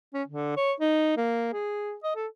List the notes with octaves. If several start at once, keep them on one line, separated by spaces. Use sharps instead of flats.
C#4
D3
C#5
D#4
A#3
G#4
D#5
A4